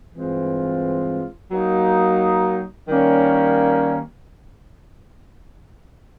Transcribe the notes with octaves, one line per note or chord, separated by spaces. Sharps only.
G2 E3 G#3 C4 F4
F#3 A#3 D#4
D#3 G3 A#3 C#4